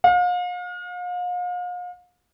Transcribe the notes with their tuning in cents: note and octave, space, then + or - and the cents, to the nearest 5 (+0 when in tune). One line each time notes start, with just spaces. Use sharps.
F5 +40